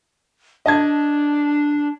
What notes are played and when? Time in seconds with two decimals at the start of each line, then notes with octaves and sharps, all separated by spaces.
0.66 D4 D#5 A5 G#6